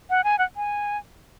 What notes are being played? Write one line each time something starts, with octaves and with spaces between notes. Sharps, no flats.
F#5
G#5
F#5
G#5